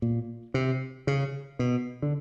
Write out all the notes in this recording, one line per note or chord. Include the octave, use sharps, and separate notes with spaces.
A#2
C3
C#3
B2
D3